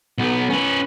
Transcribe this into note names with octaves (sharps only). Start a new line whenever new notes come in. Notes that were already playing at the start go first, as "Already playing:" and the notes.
B1 B3
C#4 B4